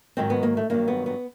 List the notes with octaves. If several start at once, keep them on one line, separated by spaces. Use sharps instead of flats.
G#2 D#3 F#3 C4
B3
A#3
A3
G2 D#3 F#3 A#3
B3
B3